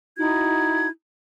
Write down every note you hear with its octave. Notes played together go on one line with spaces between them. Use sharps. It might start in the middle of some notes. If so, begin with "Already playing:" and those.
D#4 E4 F#4 G#6